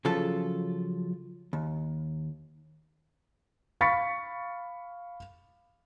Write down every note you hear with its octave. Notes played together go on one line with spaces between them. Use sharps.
C#3 F3 F#3 F4 A4
D#2
F5 B5 C#6 A6 B6 C#7